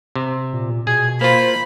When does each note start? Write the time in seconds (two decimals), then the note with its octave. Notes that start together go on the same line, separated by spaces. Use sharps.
0.15 C3
0.53 A#2
0.87 B2 G#4 G#6
1.21 A#3 F4 C5 B5